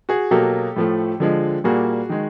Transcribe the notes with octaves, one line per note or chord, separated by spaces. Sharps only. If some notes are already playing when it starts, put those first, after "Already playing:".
F#4 G#4
B2 F#3 A#3 G4 A4
A2 F3 A3
D3 F3 G#3
A#2 G3 A#3 F#4 G#4
D#3 G#3